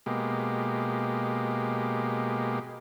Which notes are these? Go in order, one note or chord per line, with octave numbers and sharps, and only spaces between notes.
B2 G#3 A#3 G4